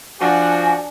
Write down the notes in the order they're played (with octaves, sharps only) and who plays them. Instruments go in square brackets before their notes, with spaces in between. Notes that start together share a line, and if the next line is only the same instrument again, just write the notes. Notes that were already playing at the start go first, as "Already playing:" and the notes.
[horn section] F3 F#4 [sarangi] D4 [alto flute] G#5